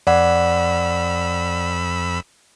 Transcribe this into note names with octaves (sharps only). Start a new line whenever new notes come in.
F2 D5 F#5 B5 E6